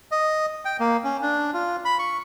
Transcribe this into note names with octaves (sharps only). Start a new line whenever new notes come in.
D#5
G5
A#3
C#4
D4
F4
B5
C#6